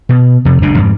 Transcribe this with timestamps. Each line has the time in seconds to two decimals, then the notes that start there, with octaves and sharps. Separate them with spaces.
0.09 B2
0.45 F2 C3
0.62 F#1 C#2 B2 D4
0.78 F2 G#2